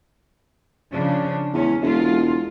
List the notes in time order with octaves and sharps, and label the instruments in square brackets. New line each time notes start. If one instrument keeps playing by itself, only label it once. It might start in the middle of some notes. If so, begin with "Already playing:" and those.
[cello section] C#3 F3 D4
[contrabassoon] E2 [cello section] G#3 C#4
[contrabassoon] E1 [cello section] G#3 F4